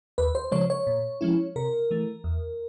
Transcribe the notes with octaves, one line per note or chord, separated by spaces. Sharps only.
D#2 B4
C5
C#3 F3 G#3 C#5
C#5
A#2
F3 G#3 C#4 E4
C3 A#4
E3 A3
E2